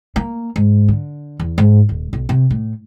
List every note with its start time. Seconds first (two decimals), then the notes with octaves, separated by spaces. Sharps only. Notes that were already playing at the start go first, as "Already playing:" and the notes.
0.16 A#3
0.56 G#2
0.88 D3
1.40 E2
1.58 G#2
1.89 D#1
2.13 B1
2.29 C3
2.50 A2